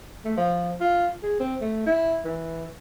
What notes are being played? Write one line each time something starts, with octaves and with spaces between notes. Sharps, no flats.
A3
F3
F4
G#4
C4
A3
E4
E3